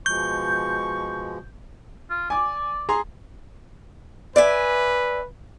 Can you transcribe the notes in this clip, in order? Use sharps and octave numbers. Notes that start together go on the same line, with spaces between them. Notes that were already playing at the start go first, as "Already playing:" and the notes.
B2 F3 G#3 C#6 G6
F4
D5 G#5 D6
G#4 A#5 C6
B4 D5 E5 G#5